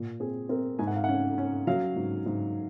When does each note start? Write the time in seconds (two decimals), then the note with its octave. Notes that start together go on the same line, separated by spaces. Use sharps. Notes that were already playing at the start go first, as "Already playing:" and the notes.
Already playing: A#2
0.20 C4 G#4
0.49 C4 A#4
0.79 G#2 G#5
0.87 F#5
0.96 F5
1.04 C#4 F#5
1.38 C#4
1.67 F#3 F5
1.96 G#2
2.26 G#2